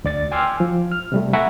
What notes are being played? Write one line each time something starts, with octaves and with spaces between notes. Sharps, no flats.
D2 D5 A6
G5 G#5 C6 D6 E6 F6
F3
F6
C3 G3 A3
E5 F#5 G#5 A#5 B5 C#6